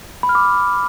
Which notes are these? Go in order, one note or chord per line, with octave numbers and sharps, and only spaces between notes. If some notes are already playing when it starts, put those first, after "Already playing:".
B5
F6
D6